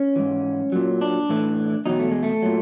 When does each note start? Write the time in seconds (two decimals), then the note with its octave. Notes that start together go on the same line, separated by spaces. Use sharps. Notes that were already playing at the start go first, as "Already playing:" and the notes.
Already playing: C#4
0.16 G#2 E3
0.72 A#2 F#3
1.01 D4
1.29 A2 E3
1.86 E2 B2 F#3 D#4
1.99 A3
2.11 G#3
2.23 A3
2.42 A#2 F#3